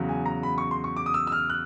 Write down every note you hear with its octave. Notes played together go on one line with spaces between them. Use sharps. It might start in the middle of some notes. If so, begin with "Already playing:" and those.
Already playing: E2 C#3 F#3
G#5
A#5
B5
C#6
C6
C#6
D6
D#6
E6
E6
F6
F#6